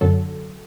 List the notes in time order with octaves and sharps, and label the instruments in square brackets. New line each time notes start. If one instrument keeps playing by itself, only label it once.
[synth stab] F#2 D3 F#3 A4